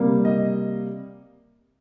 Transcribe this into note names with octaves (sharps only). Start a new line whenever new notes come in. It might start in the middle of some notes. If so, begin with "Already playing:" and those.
Already playing: C3 G3 A#3
D#5